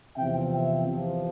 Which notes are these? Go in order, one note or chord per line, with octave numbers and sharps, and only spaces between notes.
E2 C3 F3 C4 E5 G5
E5 G5
E2 C3 F3